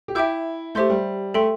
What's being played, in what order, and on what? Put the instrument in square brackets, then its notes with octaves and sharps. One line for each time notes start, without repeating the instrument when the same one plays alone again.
[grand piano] G4
[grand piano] E4 [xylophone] E5 G5 D6 G6
[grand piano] A3 [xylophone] G4 C5 E5 C6 G6
[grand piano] G3
[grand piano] A3 [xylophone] A4 E5 G5 C6